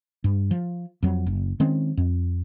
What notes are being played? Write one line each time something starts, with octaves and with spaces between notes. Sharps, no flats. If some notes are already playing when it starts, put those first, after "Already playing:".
G2
F3
F2 F#3
F#1
D#3 G#3 C4 C#4
F2